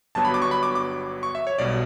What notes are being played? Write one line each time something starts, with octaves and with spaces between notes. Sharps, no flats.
G1 G2 F#3 B3 A5
B5
D6
C#6
B5
D6
D6
C#6
E5
C#5
B1 B2 G3 D5